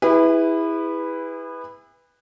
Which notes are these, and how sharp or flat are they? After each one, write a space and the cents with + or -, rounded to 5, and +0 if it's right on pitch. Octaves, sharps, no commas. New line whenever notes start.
E4 -10 G#4 -40 B4 +0